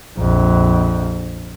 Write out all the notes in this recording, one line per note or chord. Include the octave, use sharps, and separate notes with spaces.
A#1 F2